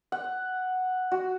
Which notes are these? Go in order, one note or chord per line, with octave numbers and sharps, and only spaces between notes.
F#5
F#4